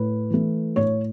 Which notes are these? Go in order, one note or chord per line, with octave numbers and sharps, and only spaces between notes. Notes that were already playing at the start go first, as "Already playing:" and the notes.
Already playing: A2 B4
E3 A3
A2 C#5